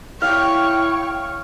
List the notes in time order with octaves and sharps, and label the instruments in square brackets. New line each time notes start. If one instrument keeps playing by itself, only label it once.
[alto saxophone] E4 [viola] C#5 C#6 [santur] F5 [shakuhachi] G5